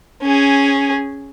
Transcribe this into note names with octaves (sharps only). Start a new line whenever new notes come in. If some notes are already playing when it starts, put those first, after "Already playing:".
C#4 G#4